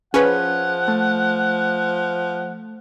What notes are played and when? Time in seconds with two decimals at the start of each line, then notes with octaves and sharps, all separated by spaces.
0.14 F3 C#4 G#4 B4 F#5
0.88 A3